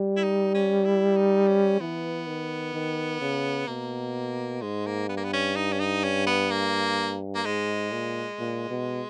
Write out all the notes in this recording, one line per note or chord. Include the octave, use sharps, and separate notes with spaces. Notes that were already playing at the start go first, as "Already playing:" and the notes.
Already playing: G3
E4
D#4
C#4
E4
D#4
C#4
E3 B3
D#3
D#3
C#3
B2 A#3
G#2 G#3
A#3
G2 B3
A#3
B3
C#4
D#4
C#4
D#4
C#4
B3
A#3
A#3
G#2 G#3
A#2
A#2
B2